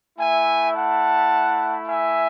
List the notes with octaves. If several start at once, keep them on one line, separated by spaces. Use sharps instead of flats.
A3 E4 E5 G#5
F#5 A5
E5 G#5